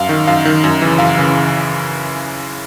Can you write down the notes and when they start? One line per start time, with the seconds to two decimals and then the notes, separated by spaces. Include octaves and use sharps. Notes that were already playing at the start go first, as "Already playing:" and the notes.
Already playing: F#2 F5
0.09 D#3
0.27 F#2 F5
0.45 D#3
0.64 F#2
0.82 C#3 E3
0.98 F#2 F5
1.18 C#3 E3